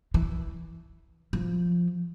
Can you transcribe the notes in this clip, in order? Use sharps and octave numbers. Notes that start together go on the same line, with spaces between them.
E3
F3